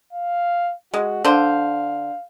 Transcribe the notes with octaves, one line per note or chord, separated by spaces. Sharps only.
F5
G#3 F#4
D3 C5 F5